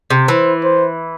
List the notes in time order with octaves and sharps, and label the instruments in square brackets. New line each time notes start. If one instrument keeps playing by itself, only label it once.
[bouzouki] C3
[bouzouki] E3 [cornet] C5
[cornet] C5